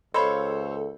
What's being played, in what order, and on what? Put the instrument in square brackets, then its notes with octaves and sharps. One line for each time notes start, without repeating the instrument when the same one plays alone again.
[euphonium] C#2 [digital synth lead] A4 [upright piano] C5 C#5 F5 [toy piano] D#5 B5